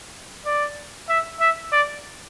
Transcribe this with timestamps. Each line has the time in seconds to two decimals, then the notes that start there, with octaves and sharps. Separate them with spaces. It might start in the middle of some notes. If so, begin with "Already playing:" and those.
0.46 D5
1.09 E5
1.41 E5
1.72 D5